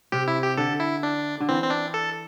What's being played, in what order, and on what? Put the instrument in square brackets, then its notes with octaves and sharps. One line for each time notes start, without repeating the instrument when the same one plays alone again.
[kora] C3 [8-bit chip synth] G4
[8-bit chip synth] E4
G4
[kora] D3 [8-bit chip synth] A4
[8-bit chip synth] E4
D4
[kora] D3
[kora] E3 [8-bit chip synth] C4
[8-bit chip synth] C4
D4
A4